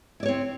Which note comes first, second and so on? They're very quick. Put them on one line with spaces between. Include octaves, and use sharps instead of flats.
E4 D5 C#5 C4